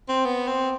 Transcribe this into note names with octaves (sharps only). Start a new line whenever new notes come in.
C4
B3
C4